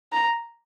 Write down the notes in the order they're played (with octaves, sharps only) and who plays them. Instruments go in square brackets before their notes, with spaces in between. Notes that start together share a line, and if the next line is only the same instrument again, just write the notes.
[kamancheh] A#5